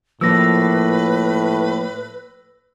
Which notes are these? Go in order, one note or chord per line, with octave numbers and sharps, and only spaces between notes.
A2 F3 A#3 B4 E6 A#6